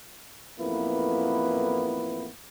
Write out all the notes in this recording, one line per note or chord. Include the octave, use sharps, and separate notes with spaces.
A1 F2 A#3 B3 E4 B4